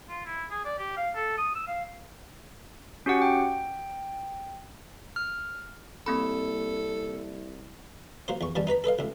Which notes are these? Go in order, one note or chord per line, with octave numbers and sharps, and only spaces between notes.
F4
E4
G#4
D5
G4
F5
A4
D#6
E6
F5
C#4 F#4 G4 F#5
G5
F6
C2 A#3 C4 A4 B5
F#3 A#3 C5
E2 C#6
E2 D#3 G3 A5
D#4 B4 A#5 B5
A4 B4 D#5 F5
C#2 A2